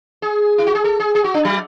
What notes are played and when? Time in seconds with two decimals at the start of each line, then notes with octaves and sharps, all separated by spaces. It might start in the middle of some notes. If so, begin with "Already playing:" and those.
0.22 G#4
0.58 E4
0.67 F#4
0.75 G#4
0.84 A4
1.00 G#4
1.15 G#4
1.24 F#4
1.34 D4
1.45 F#3